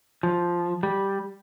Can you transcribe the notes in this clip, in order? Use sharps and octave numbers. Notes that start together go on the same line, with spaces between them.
F3
G3